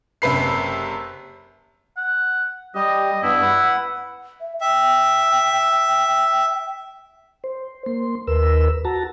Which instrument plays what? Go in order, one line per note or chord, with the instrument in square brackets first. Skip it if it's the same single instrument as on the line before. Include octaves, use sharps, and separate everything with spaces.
[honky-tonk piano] F#1 C3 B4 C7
[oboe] F#5
[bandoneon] G3 G4 [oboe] D#5
[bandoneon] G2 B3 D4 [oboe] E4
[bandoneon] B4 F#5
[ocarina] E5
[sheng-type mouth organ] E5 [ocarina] G5
[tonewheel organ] C5
A#3 C6
D#2 A#4 B4 E6
F#4 A5 A#5